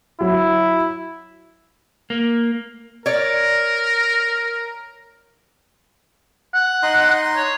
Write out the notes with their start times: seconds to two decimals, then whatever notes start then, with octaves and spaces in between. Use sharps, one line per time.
0.21 F#3 E4
2.10 A#3
3.06 A#4 C#5 D5
6.54 F#5
6.83 D#4 D#5 C6
7.36 C#5